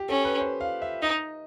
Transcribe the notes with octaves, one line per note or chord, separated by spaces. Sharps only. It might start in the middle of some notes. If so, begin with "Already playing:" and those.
Already playing: G4
C#4 A4
B4
C5
F5
E5
D#4 D#5